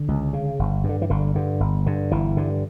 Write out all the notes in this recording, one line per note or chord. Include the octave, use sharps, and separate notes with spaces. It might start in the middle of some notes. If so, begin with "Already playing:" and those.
Already playing: D3
C#2
C#3
G1
G2
D3
E3
G1 D3
G2 D3
G1
G2 D3
G1 E3
G2 D3